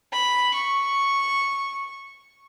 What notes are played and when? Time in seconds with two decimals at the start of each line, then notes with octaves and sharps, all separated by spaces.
0.12 B5
0.54 C#6